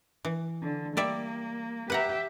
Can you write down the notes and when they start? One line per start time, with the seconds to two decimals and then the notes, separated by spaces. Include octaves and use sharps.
0.25 E3
0.62 D3
0.97 G3 A#3 D5 E5
1.90 G4 B4 E5 F#5 A#5